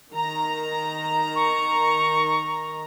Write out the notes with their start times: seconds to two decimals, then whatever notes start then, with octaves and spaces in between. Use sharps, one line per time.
0.11 D#3 A#5
1.35 C#6